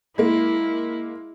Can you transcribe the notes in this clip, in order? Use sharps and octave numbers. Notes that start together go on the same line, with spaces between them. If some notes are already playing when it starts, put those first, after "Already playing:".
G#3 A#3 E4